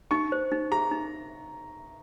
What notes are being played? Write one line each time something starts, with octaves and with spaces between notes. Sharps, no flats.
D#4 C#6
C5
D#4
G#4 A#5
D#4